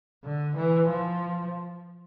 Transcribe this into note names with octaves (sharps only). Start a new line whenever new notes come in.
D3
E3
F3